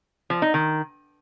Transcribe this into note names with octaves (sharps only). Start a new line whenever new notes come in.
F3
D#4
D#3